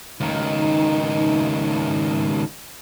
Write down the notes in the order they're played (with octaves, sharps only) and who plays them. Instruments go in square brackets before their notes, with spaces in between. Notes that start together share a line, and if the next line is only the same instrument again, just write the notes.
[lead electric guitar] C#2 D#3 [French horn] D#4